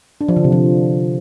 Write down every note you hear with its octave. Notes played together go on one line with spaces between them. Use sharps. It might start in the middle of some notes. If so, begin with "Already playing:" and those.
D4
F3
D3
C3
F3